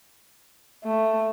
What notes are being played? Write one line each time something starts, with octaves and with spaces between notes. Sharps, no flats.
A3